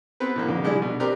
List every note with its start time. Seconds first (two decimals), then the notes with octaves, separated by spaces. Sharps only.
0.20 B3 C4 B4
0.36 A2 D3 A#3
0.49 F2 D3
0.63 D3 G3 G#3 D4 E4
0.82 B2
1.00 C4 G4 A#4 B4 D5